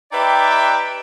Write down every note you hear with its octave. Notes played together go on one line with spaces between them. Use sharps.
D#4 G4 B4 D5 E5 G5